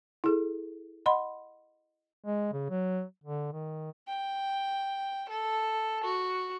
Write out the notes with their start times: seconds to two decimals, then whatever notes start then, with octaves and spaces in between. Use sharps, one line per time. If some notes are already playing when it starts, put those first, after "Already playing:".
0.24 E4 G#4 A4
1.06 D#5 F#5 B5 C6
2.25 G#3
2.53 C#3
2.70 F#3
3.24 D3
3.53 D#3
4.08 G5
5.29 A4
6.04 F#4